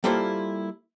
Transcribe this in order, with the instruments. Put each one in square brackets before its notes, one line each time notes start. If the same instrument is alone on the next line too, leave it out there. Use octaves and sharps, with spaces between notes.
[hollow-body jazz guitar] G3 A#3 E4 F4 A4 C5